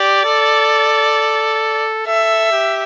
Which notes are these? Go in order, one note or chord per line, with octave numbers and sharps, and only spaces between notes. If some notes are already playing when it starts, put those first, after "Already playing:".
Already playing: G4 D5
A4
A4 E5
G4